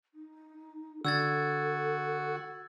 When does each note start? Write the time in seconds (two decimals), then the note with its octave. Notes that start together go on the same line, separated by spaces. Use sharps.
0.14 D#4
1.05 D3 F#4 A4 E6 G#6 A6